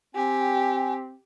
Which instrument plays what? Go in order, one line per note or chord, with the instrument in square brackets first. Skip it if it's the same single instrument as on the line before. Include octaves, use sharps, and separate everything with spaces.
[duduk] C4 [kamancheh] G4 [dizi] G#5